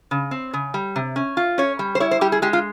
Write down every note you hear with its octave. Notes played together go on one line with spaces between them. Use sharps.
C#3
C4
C#3
G3
C3
C#4
F4
C#4 C#5
G3
C5
E4 C#5
C5
G3 G4
G#4
G#3 G4
F4